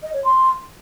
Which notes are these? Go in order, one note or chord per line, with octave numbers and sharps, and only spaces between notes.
D#5
C#5
C6